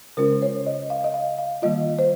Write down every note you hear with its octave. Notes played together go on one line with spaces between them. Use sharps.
C#3 G#3 C#4 F4 A#4
C#5
D#5
F5
D#5
F5
F5
D#3 G3 A#3 F4 D#5
C5